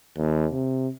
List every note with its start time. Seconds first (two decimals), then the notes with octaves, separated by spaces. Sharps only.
0.18 D#2
0.52 C3